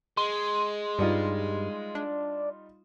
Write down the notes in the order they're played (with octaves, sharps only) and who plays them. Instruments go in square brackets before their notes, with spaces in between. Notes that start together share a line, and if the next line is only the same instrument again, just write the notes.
[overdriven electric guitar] G#3 [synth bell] C6
[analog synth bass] G2 [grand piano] G3 D#4 F4
[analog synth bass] D4